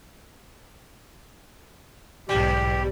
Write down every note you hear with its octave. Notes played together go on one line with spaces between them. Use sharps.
B1 E2 G#2 G3 G4